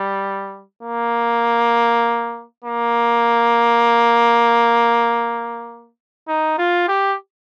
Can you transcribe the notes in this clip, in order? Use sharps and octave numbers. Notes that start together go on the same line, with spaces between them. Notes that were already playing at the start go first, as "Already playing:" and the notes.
Already playing: G3
A#3
A#3
D#4
F4
G4